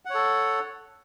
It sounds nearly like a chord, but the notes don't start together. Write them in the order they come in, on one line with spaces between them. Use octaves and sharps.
F#5 C#5 A4